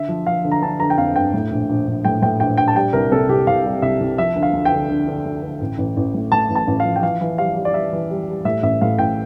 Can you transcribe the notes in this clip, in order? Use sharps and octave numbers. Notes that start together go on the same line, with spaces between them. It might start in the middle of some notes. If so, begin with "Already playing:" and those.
Already playing: D3 E5
F3
F3 F5
D3
A#5
D3 A5
D3 A#5
G5
F2 F5
G1 G5
A2
A#1
A#1
A#1
A2 G5
A2 G5
A#1 G5
A#1 G5
A5
G3 G5
C2 A#4
C3 A4
C2 G4
C2 F5
G3
C2 E5
C2
F3 E5
D2
F5
D2
G5
D3
D3
D3
D2
D3
A1
A1
A1
A2
A2 A5
A1
A5
A1
F5
F3
G5
E3 F5
E3
G3 F5
G3
D5
G3 E5
E3
G3
G3
A2 E5
A1 E5
A2 F5
A1 G5